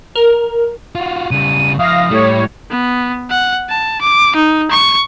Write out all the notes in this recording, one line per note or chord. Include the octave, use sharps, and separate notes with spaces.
A#4
F4 F#4
C#3 G3 D#7
F3 E5 F5 D#6 A#6
A2 G3 C#5
B3
F#5
A5
D6
D#4
C#6